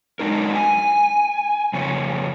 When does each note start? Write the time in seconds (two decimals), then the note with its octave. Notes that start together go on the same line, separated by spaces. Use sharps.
0.20 F#3 G#3 D4 D#4 A#4
0.55 G#5
1.74 F2 C#3 C#4